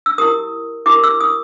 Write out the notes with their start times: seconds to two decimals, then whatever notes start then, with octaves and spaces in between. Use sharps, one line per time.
0.06 E6
0.18 E4 G4 A#4 D#6
0.86 E4 G4 A#4 D6
1.04 E6
1.20 D#6